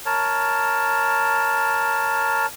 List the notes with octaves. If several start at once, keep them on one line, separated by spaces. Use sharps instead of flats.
A#4 C#5 A5